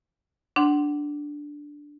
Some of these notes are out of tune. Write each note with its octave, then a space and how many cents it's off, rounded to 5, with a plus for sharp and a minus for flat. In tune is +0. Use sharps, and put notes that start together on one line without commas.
D4 +0 F#5 +20 C6 +0